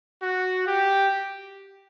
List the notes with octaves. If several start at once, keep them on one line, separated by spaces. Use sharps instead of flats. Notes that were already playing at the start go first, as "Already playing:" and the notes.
F#4
G4